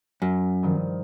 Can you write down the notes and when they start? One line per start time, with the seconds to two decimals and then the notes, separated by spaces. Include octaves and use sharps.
0.22 F#2
0.63 G2 D#3 F3